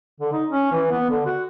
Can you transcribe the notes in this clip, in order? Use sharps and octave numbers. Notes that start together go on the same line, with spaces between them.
D3
D#4
C#4
E3
B3
D3
F#4